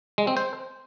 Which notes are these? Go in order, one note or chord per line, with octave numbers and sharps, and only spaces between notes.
G#3
C4
C5